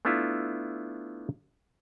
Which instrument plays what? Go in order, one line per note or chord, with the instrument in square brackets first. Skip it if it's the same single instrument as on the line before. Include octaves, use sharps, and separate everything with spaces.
[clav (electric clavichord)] A3 B3 D4 E4 F4